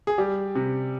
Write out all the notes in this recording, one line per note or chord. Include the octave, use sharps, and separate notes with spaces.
G#4
G3 G4
C3